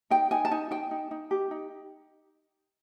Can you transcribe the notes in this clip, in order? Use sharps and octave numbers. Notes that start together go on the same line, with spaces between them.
D#4 G5
D#4 G#5
A5
D#4 G#5
D#4 G5
D#4
D#4
G4
D#4